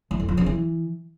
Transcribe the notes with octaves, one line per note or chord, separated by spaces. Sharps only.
E3
F2
F3
C#3
E3